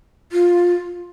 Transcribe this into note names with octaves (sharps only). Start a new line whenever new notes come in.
F4